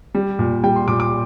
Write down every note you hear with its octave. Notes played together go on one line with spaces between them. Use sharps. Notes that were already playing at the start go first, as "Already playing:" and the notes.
G3
A#2
G3 G5
C6
A#2 D6
D6